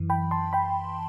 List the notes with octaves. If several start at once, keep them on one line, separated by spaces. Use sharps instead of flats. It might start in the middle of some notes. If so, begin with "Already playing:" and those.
Already playing: F#2 E3
G5 B5
A5 C6
G5 B5